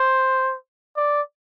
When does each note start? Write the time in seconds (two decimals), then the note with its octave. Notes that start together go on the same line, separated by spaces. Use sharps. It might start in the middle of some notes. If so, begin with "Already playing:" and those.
Already playing: C5
0.97 D5